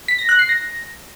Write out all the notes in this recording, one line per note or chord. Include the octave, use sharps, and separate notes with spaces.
B6
A#6
F#6
C7
A#6